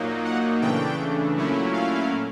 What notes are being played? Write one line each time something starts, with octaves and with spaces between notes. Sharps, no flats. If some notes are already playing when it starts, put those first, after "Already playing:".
Already playing: A#2 F#3 A#3 D#4
F#5
C#3 E3 A3 D4 G5
A#2 F#3 A3 C#4 E4
F5